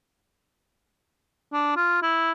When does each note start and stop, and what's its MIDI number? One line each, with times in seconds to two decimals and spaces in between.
1.53 1.75 62
1.77 2.01 65
2.02 2.32 64